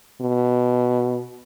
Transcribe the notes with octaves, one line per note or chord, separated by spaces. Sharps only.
B2